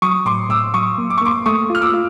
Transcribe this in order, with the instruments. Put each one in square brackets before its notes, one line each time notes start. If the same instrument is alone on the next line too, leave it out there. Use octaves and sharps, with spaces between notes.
[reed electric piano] F#3 [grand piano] C#6 D#6
[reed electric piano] A2 [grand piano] C6 D6
[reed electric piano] A2 [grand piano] D6 E6
[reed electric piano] F#3 [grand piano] C#6 D#6
[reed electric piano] A#3
[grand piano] D6
C#6
[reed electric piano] A#3 [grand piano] C6 D6
[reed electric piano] A3 [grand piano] C#6 D#6
[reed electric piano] F4 [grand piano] F6
[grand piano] D6 E6
[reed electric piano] F4